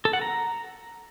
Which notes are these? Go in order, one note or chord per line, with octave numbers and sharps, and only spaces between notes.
A4
F#5
A#5